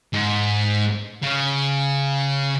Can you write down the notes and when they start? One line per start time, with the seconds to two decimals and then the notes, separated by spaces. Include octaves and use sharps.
0.13 G#2
1.23 C#3